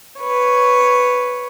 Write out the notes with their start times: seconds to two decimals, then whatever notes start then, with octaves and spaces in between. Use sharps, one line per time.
0.20 B4 C#5